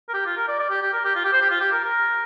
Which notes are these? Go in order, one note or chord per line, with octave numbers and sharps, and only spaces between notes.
A#4
G4
F4
A#4
D5
D5
G4
G4
A#4
G4
F4
G4
C5
G4
F4
G4
A#4
A#4